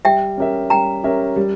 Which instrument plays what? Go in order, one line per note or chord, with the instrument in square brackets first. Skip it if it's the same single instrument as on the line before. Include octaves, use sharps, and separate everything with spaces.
[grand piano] G3 [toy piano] E5 G5
[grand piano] C#4 G4 A#4 E5
[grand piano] G3 [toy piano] G5 A#5
[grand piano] C#4 G4 A#4 E5
G3